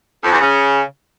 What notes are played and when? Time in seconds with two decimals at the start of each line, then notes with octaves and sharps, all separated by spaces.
0.24 F2
0.32 E2
0.40 C#3